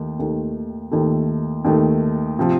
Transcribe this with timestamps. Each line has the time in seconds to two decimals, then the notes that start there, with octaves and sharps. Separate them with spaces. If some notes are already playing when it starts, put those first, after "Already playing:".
Already playing: D#2 D#3 A3
0.19 D#2 D#3 A3
0.91 D#2 D#3 A3
1.65 D#2 D#3 A3
2.39 C3 F3